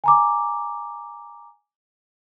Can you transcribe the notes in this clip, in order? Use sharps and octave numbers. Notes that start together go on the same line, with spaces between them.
G#5 A#5 D6